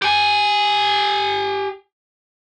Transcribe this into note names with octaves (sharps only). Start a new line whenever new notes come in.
G4 G#5